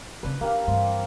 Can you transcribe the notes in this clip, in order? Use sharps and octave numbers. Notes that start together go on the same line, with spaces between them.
C#3 C4 D4 B4
A#3 D4 G4 F5
G2 E3 C4